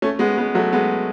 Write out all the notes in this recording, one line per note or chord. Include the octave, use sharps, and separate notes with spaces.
A3 C#4
G#3 B3
G#3 B3
F#3 A3
G#3 B3